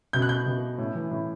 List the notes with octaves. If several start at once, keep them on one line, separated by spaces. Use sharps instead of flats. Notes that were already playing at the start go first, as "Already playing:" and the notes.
B2 G6
F#6
G6
B2
A2
E3
A2